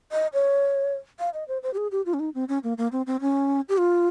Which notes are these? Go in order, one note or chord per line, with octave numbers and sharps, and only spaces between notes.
D#5
C#5
F5
D#5
C5
C5
G4
G#4
G4
F4
C#4
D#4
C4
C#4
A#3
A#3
C4
C4
C#4
G4
F4